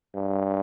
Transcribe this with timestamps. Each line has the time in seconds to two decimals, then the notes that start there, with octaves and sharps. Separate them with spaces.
0.15 G2